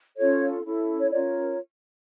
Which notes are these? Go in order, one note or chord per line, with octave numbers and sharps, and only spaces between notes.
C#4 F4 A4 C#5
C#4 E4 A4
C#5
C#4 F4 A#4 C#5 D5